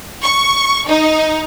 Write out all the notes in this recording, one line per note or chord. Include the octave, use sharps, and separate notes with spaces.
C#6
D#4